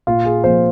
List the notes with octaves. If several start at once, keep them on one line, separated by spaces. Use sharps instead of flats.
A#2 F4
G#4
F3 A#3 C5